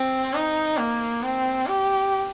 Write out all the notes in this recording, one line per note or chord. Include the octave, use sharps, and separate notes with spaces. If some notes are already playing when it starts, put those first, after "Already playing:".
Already playing: C4
D#4
A#3
C4
G4